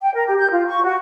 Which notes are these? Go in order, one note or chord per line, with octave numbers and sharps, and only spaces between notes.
G5
A#4
G4
G6
F4
C#6
F#4